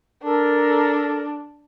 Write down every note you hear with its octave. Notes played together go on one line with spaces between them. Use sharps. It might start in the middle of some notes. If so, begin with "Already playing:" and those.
D4 A4 A#4